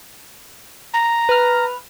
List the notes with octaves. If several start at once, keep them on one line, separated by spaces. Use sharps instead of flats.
A#5
B4 F6